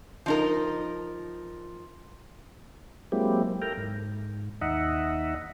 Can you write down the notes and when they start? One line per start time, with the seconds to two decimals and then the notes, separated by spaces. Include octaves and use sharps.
0.26 F3 D#4 A#4
3.12 F#3 G#3 A#3 C4 E4 G4
3.62 A4 A#4 G5 A#5
3.77 G#2
4.61 D#2 D#4 D#5 E5 F#5